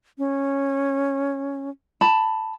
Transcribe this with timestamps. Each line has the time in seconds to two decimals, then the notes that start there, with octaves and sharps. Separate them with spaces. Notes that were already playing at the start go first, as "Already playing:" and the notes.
0.18 C#4
2.01 A5 B5